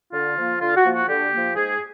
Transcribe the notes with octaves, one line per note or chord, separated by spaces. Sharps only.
D3 F4
F3 A#3
D3 F4
F#4
F3 A#3
F#4
D3 G4
F3 A#3
G#2 G#4